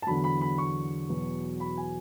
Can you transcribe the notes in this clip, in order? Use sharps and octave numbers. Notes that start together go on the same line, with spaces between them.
A5
E2 D3 F#3 B5
B5
B5
C#6
E2 B2 F#3
B5
G#5